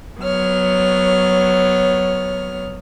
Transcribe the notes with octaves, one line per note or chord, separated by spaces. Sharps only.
F#3 B3 C#5 F6